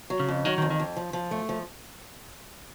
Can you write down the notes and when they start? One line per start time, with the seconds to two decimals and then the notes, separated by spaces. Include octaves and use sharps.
0.10 F#3
0.20 C#3
0.28 F2
0.45 D#3 F#3
0.58 D#3
0.62 F2
0.70 D#3
0.80 F2
0.97 F3
1.13 F3
1.31 A3
1.49 F3